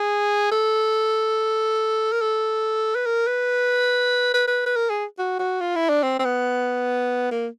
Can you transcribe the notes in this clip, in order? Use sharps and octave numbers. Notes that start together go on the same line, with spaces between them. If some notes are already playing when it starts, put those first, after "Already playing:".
Already playing: G#4
A4
A#4
A4
B4
A#4
B4
B4
B4
B4
A#4
G#4
F#4
F#4
F4
E4
D4
C4
C4
B3
A#3